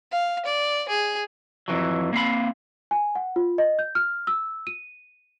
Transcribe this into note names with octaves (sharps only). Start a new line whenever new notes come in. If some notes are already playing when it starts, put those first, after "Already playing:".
F5
D5
G#4
F2 E3 F#3
A#3 C4 F5 B5
G#5
F#5
F4
D#5
G6
F6
E6
D#7